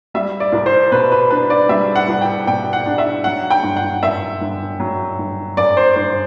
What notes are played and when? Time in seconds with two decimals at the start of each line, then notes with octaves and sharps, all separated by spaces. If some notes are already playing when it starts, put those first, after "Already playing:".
0.14 G3 E5
0.40 D5
0.53 C2
0.66 C5
0.92 B2 B4
1.12 B4
1.31 D4 B4
1.50 D5
1.69 G3 E5
1.95 F#5
2.08 C2
2.21 G5
2.47 B2 G5
2.73 F#5
2.86 D4
2.98 E5
3.24 F#3 F#5
3.50 G5
3.63 G1
3.76 F#5
4.03 F#2 E5
4.41 G1
4.80 F#3
5.19 G1
5.57 F#2 D5
5.77 C5
5.96 G1 C5